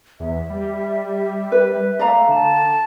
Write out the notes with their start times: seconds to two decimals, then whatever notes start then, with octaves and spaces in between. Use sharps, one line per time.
0.20 E2 E5
0.50 G3
1.52 B4
1.99 A3 D5 F5 A#5
2.29 D3 A5